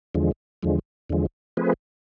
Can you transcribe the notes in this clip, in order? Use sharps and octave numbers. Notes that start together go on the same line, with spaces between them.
E2 D3 F3 G#3
E2 D3 F3 G#3
E2 D3 F3 G#3
F3 A3 C4 G#4 B4